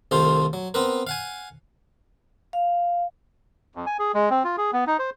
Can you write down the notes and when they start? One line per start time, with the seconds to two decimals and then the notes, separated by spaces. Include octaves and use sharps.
0.11 C2 D#3 A3 F4 C5
0.53 F#3
0.74 B3 C4 A#4 B4
1.07 F5 F#5 G#5
2.53 F5
3.75 F2
3.86 G#5
3.99 G#4
4.14 G#3
4.30 C4
4.44 F4
4.57 G#4
4.73 B3
4.87 D#4
4.99 C5